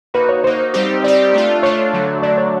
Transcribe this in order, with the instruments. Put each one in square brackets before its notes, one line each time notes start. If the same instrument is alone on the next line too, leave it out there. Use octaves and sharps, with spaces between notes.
[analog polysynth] A#3 D#4 F#4 [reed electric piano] B4
[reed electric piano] C#5
[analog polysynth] A#3 D#4 F#4 [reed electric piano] C5
[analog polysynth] G3 C4 D#4 G4
[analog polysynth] G3 C4 D#4 G4 [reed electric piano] D5
[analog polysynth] A3 D4 F4
[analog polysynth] A3 D4 F4 [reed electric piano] C#5
[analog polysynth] D3 F#3 A3 D4
[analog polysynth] D3 F#3 A3 D4 [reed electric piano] D5
[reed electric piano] C#5